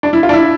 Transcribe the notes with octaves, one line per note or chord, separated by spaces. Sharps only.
D4
E4
F4
D4
E4